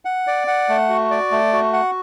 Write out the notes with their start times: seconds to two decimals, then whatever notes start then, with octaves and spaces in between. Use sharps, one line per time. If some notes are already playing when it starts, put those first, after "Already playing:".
0.05 F#5
0.27 D5
0.47 F#5
0.69 A3
0.89 F#4
1.10 D5
1.31 A3
1.53 F#4
1.73 F#5